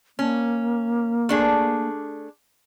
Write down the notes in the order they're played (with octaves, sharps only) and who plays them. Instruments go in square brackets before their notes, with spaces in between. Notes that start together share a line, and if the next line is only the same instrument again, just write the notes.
[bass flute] A#3 [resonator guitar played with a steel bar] C#4
[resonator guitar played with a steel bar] A3 D4 G#4